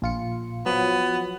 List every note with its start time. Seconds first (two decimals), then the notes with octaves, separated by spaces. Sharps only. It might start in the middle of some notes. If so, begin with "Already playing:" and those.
0.02 A#1 F4 C#7
0.66 F3 F#3 B3